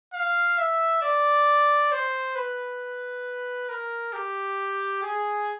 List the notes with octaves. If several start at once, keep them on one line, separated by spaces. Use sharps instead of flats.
F5
E5
D5
C5
B4
A#4
G4
G#4